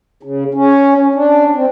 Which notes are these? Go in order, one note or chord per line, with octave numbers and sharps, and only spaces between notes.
C#3
C#4
D4
C4